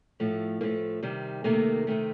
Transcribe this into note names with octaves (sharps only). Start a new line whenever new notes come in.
A2 F3 A3
A2 F3 A3 A#3
C3 D#3 G3
C3 D#3 A3 A#3
C3 D#3 A3